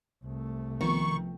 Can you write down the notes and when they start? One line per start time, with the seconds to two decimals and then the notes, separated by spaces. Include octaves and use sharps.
0.23 C2 A3
0.81 C3 D#3 F3 B3 C#6